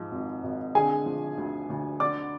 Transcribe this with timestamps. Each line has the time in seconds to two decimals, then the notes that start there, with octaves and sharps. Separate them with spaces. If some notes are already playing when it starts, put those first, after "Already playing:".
Already playing: G#2 F3
0.12 G#1
0.43 G#1
0.75 D3 G#4 G#5
1.06 F3
1.38 D2
1.70 D2
2.00 D3 D5 D6